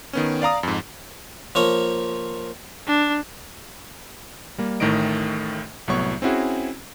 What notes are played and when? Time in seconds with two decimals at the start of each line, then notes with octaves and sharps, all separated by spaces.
0.13 D#3 B3 C#4
0.42 D5 F5 A#5 D#6
0.63 F2 G#2
1.55 F3 A#3 C#5
2.87 D4
4.58 G3 A#3
4.80 A1 A2 D#3 A3 D#5 D7
5.88 C2 A2 F#3 B3 C#5 C#6
6.22 C4 C#4 E4 F#4 G#4